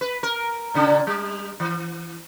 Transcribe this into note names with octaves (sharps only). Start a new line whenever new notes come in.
B4
A#4
A#2 C#3 D4
G3
E3